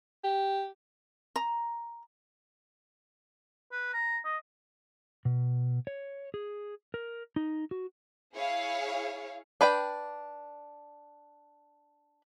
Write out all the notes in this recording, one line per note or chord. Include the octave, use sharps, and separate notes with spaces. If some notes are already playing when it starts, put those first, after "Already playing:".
G4
A#5
B4
A#5
D#5
B2
C#5
G#4
A#4
D#4
F#4
E4 G#4 C#5 F5
D4 B4 D5 G5